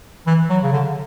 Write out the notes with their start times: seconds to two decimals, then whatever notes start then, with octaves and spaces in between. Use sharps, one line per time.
0.27 E3
0.49 F#3
0.63 C#3
0.72 D3